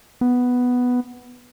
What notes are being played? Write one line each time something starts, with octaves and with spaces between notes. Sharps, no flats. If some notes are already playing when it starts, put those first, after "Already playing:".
B3